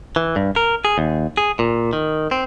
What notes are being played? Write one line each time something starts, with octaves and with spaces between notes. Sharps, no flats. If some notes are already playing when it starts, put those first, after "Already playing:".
E3
G2
A#4
G#4
D#2
G#4
A#2
D#3
C4